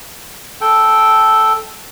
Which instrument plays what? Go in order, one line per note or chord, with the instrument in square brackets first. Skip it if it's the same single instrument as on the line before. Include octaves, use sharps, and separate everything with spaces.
[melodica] A4 G5